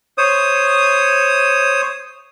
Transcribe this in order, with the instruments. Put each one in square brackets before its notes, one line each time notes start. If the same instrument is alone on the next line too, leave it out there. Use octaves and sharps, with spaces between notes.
[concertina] C5 C#5 D#6